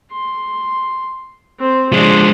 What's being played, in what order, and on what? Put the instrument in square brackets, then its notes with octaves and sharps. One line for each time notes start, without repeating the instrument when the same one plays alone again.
[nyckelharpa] C6
C4 C5
[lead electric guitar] F3 G#3 [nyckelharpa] D4 C5